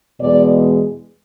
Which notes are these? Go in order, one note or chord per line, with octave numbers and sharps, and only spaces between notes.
E2 B2 G#3 D5